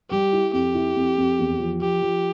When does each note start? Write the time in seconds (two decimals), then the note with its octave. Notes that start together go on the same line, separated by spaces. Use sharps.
0.10 G3 G4
0.33 E4
0.53 F2 G4
0.74 E4
0.96 F2
1.18 F2
1.39 E2
1.60 F3
1.81 F3 G4
2.02 F3